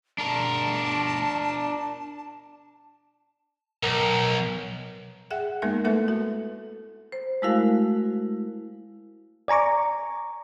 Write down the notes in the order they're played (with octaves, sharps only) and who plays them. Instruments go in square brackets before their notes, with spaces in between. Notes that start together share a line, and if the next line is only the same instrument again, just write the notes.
[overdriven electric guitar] D4 A#4 [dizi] A5
[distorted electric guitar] B1 [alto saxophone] A#4
[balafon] G#4 E5 F#5 G5
G#3 A#3 B3 D#4 A#4 E5
A3 E4 A4 B4 E5
F#4 A4
[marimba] C5
G#3 A3 E4 F#4 A#4 F5
[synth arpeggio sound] D5 G#5 A#5 C#6 D6